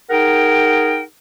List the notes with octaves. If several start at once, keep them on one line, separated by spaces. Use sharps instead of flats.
D#4 G#4 A#4 F#5 G5